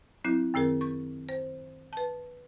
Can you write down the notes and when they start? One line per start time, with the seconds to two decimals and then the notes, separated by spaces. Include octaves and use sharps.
0.24 F#3 C4 E4 F#6
0.54 F#2 D#3 C4 G#4 A#4
0.81 C#6
1.29 C5
1.93 B4 A5